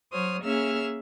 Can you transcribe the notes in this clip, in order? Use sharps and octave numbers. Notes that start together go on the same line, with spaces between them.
F#3 C5 C#5 D#6 F6
A#3 C#4 G#4 E5 E6 F6